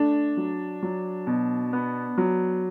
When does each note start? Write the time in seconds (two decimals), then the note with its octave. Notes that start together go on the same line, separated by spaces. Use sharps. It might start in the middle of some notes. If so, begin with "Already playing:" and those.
Already playing: A3 D4
0.37 F#3
0.83 F#3
1.27 B2
1.73 B3
2.18 F#3